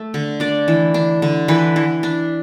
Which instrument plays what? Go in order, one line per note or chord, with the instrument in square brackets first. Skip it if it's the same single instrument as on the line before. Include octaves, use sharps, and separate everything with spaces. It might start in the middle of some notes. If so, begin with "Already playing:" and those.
Already playing: [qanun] A3
D3
D4 D5
E3
D4
D3
E3 B4
E3
D4